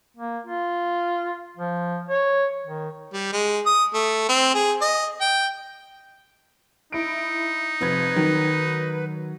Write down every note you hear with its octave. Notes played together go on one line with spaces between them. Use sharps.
A#3
F4
F3
C#5
D#3
G3
G#3
D#6
A3
C4
G#4
D#5
G5
D#4 E4 D7
F1 F3 B4 G#6
D#3 F#3